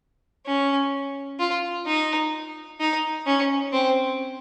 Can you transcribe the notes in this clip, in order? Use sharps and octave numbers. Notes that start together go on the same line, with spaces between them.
C#4
F4
D#4
D#4
C#4
C4